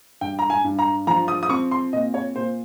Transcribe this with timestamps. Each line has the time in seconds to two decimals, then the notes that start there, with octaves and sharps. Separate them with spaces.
0.21 G2 G5
0.39 A#5
0.50 G#5
0.64 G2
0.79 A#5
1.07 F3 A#5
1.28 D#6
1.43 D#6
1.50 C4 C#6
1.71 C6
1.93 A#2 D#5
2.14 C#5
2.36 A#2 C5